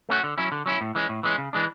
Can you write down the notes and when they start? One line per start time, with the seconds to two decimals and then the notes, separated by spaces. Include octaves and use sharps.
0.09 A3 C#4 F#4
0.23 D3
0.37 F#3 C#4 E4
0.52 D3
0.66 F#3 C#4 E4
0.81 A2
0.95 E3 G#3 C#4
1.09 A2
1.23 E3 G#3 C#4
1.38 C#3
1.53 E3 G#3 D4